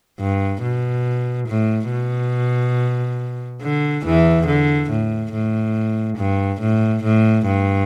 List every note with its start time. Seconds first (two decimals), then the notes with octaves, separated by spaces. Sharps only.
0.20 G2
0.63 B2
1.48 A2
1.91 B2
3.61 D3
4.04 E2 E3
4.47 D3
4.90 A2
5.33 A2
6.18 G2
6.61 A2
7.03 A2
7.46 G2